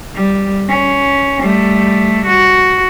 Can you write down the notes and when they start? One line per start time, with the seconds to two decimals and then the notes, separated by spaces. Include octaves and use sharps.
0.15 G3
0.68 C#4
1.42 G3 A3
2.26 F#4